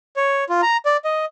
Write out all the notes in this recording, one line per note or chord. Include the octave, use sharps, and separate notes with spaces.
C#5
F4
A#5
D5
D#5